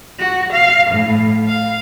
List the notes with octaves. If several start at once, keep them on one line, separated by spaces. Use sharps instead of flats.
F#4
F5
A2
F5